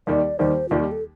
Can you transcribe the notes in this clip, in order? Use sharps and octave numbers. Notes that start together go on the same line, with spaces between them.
D#2 D#3 G3 D5
D#2 D#3 G3 C5
D#2 D#3 G3 F4
G4
A4